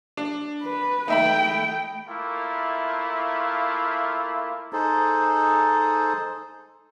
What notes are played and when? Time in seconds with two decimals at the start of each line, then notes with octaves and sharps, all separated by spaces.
0.17 D4
0.62 B4
1.08 A3 D#4 E5 G5 B5
2.07 A3 A#3 E4 F4
4.73 D#4 G#4 A4 C5